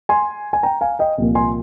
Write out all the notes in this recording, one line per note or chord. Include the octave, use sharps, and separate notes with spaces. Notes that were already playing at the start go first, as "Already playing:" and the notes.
G#5 C6
G#5
G5 A#5
F5 G#5
D#5 G5
C2 A#2 F3 A#3
G#5 C6